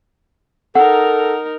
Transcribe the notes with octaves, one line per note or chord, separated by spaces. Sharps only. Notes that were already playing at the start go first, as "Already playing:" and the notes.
D#4 A4 A#4 F#5